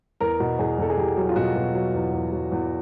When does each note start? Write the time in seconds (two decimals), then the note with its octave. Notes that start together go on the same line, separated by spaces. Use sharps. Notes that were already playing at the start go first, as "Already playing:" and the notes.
0.20 E2 A#4
0.40 B2
0.59 E2 G#4
0.78 E2 A4
0.90 G#4
0.97 E2 G4
1.17 F#3
1.29 F4
1.36 B2 F#4
1.56 B2
1.75 F#3
1.94 E2
2.13 E2
2.32 F#3
2.52 E2